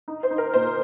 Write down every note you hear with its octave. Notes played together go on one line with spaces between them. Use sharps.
D#4
C5
D#4
A#4
A#2 C5